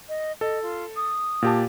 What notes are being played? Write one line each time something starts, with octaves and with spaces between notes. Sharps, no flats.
D#5
A4 D#5
F4
D#6
A#2 G4 A5